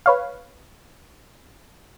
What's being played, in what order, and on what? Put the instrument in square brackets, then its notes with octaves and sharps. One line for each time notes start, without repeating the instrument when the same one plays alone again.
[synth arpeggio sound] B4 C#5 F5